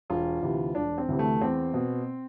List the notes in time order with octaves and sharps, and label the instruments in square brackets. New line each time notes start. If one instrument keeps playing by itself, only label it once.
[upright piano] E1 F4
D2 C3 E3
E1 D4
C4
D2 C3 E3
A3
E2 C4
B2